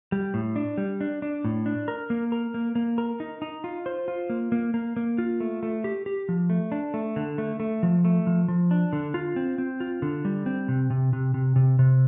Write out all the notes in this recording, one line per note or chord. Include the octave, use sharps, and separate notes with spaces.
G3
A2
D4
G3
D4
D4
A2
D4
A#4
A#3
A#4
A#3
A#3
A#4
D#4
D#4
F4
C5
F4
A#3
A#3
A#3
A#3
F4
A3
A3
G4
G4
F3
A3
D4
A3
D3
A3
A3
F3
A3
F3
F3
D4
D3
F4
C4
C4
F4
D3
G3
C4
C3
C3
C3
C3
C3
C3